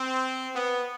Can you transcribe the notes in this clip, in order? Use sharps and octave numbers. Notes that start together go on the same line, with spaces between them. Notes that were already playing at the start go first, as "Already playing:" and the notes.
Already playing: C4
B3